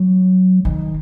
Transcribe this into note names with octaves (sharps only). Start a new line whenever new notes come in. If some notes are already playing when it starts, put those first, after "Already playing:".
Already playing: F#3
D#3